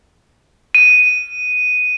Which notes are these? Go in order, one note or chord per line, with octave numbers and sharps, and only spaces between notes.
D#7